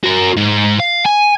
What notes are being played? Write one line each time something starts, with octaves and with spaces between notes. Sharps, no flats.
F#4 A#4
G#2
F5
G#5